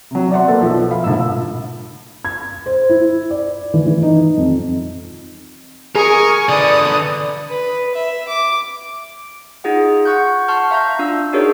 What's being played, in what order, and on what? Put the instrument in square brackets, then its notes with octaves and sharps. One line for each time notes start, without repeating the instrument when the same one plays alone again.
[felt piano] C3 F#3
D5 E5 F#5 C6
A#3 B3 A4
B1 F3 E5
F5 B5
F1 A#1 G#2 E6
G#6
C5
E4
D5
E3
E3
D#4
F2
[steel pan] G#4 [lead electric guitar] A#4 [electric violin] G#5 C#6
[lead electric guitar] D3 B4 [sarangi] D5 [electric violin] D#6
[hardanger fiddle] B4
E5
D6
[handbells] D#4 F4 G#4 F#5
F#5 C#6 F#6 G6
A5 C6 C#6 F6
E5 F5 A#5 G6
D4 F4 E6
D4 D#4 F#4 G#4 A#4 C#5